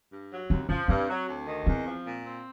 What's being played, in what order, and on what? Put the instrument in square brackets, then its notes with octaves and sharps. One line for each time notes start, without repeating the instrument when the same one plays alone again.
[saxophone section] G2
F#3
[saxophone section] D#2 [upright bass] C4
[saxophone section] F3 [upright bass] C#4
[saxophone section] G2 [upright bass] C4
[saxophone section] F#3
D2
D#3
[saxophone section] E2 [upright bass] C4
[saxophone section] F3
A#2
C4